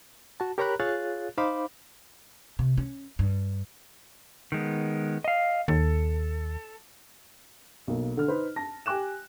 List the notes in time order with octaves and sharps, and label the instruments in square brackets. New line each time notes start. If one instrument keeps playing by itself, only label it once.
[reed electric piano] F#4 A5
G4 A#4 C#5 A#5 B5 F#6
F4 G#4 C#5 F5 F#6 A6
D#4 C5 F5 B5 D6
[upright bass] C3
C#4
G2
[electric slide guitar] D#3 G#3 B3
D#5 F5
[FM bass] D#2 [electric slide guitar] A4
[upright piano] B1 A#3
D3 F6
D#4 B4 C5
A5 A#6
G4 G5 G#5 D6 F#6 E7